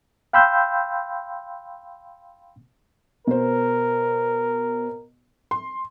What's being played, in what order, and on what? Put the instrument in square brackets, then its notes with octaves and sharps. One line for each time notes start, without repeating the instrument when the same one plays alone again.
[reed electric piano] F5 G5 B5 C6 E6 G6
[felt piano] B2 C5 [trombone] A#4
[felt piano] C6